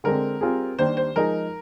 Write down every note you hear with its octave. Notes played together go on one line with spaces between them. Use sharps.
D3 G#3 C4 A#4
G3 C4 F4 G#4
D#3 G3 A#3 D4 G4 C5
C5
F3 G#3 D#4 G#4 A#4